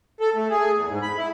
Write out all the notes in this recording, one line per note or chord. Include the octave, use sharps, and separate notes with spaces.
A4
A3
G#4
E2
G#2
B5
E4